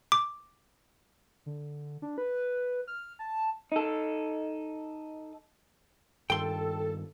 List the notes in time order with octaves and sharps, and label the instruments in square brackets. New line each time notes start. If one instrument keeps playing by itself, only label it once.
[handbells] D6
[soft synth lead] D3
D4
B4
F6
A5
[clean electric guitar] D#4 A4
[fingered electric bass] G2 D#3 [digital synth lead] A4 [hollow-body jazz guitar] G5 C6